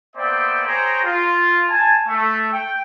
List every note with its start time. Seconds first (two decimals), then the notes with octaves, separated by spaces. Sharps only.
0.16 A#3 B3 C5 D5 E5 G5
0.67 G#4 C5 C#5 G5 A#5
1.04 F4
1.69 G#5 A5
2.08 A3
2.52 G5